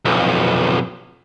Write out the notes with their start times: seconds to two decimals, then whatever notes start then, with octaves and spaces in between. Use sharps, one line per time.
0.05 B1 F2